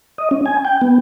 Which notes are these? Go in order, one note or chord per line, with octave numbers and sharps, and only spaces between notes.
D#5
C#4
G#5
G5
B3